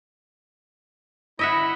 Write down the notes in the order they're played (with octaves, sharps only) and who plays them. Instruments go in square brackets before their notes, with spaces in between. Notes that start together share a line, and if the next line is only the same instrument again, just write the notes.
[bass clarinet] E4 [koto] D#5 E5 F#5